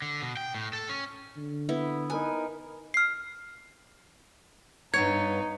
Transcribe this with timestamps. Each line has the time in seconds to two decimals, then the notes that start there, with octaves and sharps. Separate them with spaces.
0.02 D3
0.22 B2
0.37 G5
0.55 A2
0.73 A4
0.89 C#4
1.37 D3
1.69 B3 E4
2.10 D#4 A#4 B4 G#5
2.94 F6 C7
4.94 G2 B3 D#4 C#5 G#6